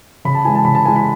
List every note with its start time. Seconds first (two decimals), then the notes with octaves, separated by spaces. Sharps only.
0.25 C#3 B5
0.35 A5
0.44 E3 G#3 G#5
0.55 A5
0.65 C#3 B5
0.75 A5
0.85 E3 G#3 G#5
0.96 B5